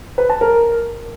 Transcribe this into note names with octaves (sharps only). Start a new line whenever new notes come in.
B4
A5
A#4